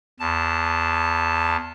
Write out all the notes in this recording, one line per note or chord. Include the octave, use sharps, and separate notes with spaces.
E2 A5